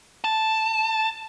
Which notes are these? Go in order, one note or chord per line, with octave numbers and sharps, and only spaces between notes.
A5